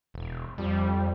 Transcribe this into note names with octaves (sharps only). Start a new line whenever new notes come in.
E1
F2 G3